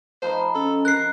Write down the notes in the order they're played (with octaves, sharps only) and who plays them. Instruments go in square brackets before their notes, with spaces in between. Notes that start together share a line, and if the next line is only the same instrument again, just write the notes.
[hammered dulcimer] F3 D#4 B5 [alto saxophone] C5
[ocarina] C#4 [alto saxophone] A4
[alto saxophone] A#4 [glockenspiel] F#6 C7